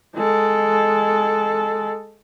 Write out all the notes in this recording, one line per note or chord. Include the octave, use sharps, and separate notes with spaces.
G#3 A4